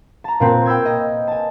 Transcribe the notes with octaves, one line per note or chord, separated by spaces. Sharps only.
A5 A#5
A#2 C4 B4
G5 B5 E6 G#6
D#5
G#5 A5